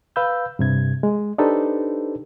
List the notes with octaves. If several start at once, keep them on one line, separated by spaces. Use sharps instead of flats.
B4 F5 B5 E6 G6
G2 C3 G#6
G#3
D4 D#4 G4 A4 B4 C5